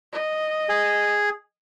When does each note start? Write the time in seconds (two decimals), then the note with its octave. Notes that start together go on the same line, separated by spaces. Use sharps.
0.12 D#5
0.69 G#4